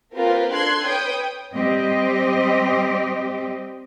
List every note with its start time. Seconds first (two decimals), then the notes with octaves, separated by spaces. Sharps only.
0.14 A#3 C4 F4 G4 A#4 B4
0.51 D4 A4 C6 F#6 G#6 C7
0.84 B4 C#5 G5 D#6
1.54 G3 C4 G4 D#5